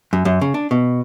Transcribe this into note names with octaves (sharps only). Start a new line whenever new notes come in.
F#2
F#2
C#3
D4
B2